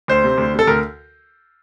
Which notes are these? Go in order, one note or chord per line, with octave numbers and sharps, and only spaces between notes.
D2 C5
C3
D2
C3
A4
D2 A#4